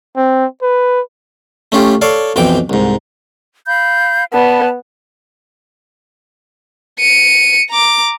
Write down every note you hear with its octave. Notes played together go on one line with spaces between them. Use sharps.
C4
B4
A3 C#4 F4 G4
A4 C#5 D5 F5
B1 F2 E3 G5 D6
C2 G#2
F5 B5 G6
B3 D5 A5 B5
C#7 D#7
A#5 D6